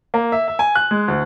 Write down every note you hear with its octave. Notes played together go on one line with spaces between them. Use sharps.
A#3
E5
E5
G#5
F#6
G#3
D2